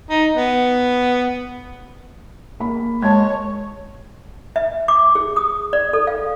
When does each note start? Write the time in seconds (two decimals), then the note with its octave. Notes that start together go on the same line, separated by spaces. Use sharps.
0.10 D#4
0.36 B3
2.60 A#3 B5
3.02 G#3 C#5 A5 G#6
4.56 E5
4.88 D6
5.15 G#4
5.36 D#6
5.73 D5
5.93 A4
6.07 F5